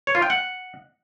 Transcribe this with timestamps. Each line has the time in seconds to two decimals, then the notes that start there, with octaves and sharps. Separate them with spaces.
0.07 C#5
0.15 F4
0.22 G5
0.30 F#5